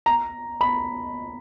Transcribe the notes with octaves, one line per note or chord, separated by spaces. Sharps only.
A#5
B5